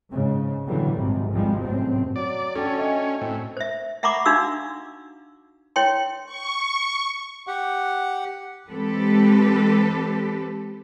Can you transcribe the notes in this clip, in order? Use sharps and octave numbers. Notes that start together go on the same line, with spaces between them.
G#2 C#3
A#2 D3 E3 F#3 G3
G#1 G#2 C3
G#1 F2 F3 G3 G#3
F#2 A2 C3 C4
F#3 D5
C#4 D4 F#4 A4 C#5 G5 A6
A3 D#5 G5 G#5
A2 C4
C5 E5
E5 F#5 A#5 B5 C#6 D6
D4 D#4 F#4 F5 E6
E4 C#5 G5 C6
C#6
G4 F#5
E3 G#3 C4 G4 A4 B4